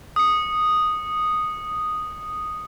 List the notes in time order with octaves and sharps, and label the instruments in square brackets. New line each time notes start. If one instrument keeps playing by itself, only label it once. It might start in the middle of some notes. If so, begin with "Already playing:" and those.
[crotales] D#6 C#7